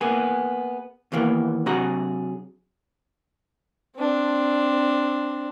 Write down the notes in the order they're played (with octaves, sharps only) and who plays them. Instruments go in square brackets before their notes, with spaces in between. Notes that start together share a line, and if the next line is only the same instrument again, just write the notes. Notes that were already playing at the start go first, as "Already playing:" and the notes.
[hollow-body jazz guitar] A#3 B3 G#4
D#2 E3 A#3 B3
C3 F#3 D4 F#4 G#4 A#5
[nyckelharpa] C4 D4